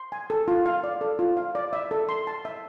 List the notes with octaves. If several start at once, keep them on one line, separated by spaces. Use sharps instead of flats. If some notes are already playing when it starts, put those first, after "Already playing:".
Already playing: C6
G#5
A4
F4
F5
D5
A4
F4
F5
D5
E5
A4
C6
A5
E5